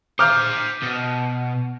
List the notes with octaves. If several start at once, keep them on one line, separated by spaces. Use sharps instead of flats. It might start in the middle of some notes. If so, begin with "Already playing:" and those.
C5 A#5 D6 F6 G6
B2